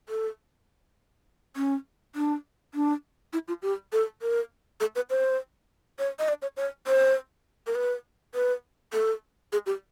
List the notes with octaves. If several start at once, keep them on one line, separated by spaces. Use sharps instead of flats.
A4
C#4
D4
D4
E4
F4
G4
A4
A#4
A4
B4
C5
C#5
D#5
D5
C#5
C#5
C5
A#4
B4
B4
A4
G#4
G4